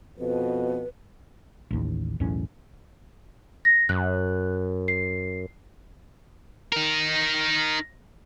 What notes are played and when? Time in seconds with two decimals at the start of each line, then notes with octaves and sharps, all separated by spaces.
0.18 F2 B2 B4
1.71 A1 D#2
2.20 B1 E2 A2 C#4
3.65 A#6
3.89 F#2 F#6
4.88 C7
6.72 D#4 A#4